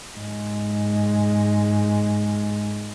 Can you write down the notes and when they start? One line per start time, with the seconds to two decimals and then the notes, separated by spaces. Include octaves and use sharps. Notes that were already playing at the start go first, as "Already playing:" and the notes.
0.16 G#2 G#3